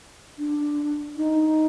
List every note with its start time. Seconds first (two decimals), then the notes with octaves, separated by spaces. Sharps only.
0.39 D4
1.17 D#4